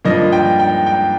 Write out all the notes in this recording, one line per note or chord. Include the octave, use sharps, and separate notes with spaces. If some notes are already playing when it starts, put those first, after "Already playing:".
G2 F3 A#3 D#5
G5
G5
G5